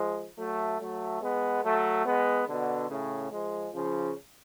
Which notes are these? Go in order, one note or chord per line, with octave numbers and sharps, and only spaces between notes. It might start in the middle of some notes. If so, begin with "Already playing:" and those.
Already playing: F3 G#3
F#3 A3
F#3 A3
G#3 B3
F#3 A3
G#3 B3
B2 D3
A2 C#3
F3 G#3
C#3 F3